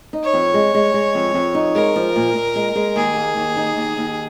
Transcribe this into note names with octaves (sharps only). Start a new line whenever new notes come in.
D#4
C#5
F2
G#3
G#3
G#3
F2
F2
D#4
G#3 A#4
F3
A#2
A#2
G#3
G#3
D#2 G#4
A#3
D#2
D#4
D#2
D#2